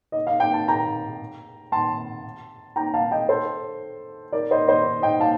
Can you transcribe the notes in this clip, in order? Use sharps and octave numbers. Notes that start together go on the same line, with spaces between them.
D#5
F5
G5
A5
G5 A#5
A5 C6
G5 A#5
F5 A5
D#5 G5
A4 C5
A#4 D5
C5 D#5
C5 D#5
D#5 G5
F5 A5